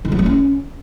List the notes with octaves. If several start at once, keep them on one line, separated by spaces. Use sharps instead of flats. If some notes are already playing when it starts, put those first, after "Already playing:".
D#3
F#3
A#3
C#4